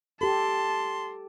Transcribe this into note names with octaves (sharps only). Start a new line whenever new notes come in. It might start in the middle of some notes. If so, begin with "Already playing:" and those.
G4 A4 A5 C6